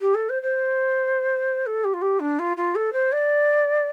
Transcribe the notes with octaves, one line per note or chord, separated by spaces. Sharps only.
G4
A4
C5
C5
A4
G4
F4
G4
D4
F4
F4
A4
C5
D5